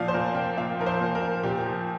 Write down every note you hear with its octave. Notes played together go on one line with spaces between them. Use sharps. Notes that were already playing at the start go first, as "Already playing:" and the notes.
Already playing: A#2 F3 D5 F5
C5
A#2 A#4
A#2 G5
A#2 F5
F3 A#4
C5
A#2
A#4
A#2
A#2 G4
G4
F3